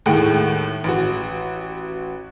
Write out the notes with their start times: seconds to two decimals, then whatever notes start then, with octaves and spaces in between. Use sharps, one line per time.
0.06 D#2 A2 G#3 A3 F#5 G5
0.84 A1 F#4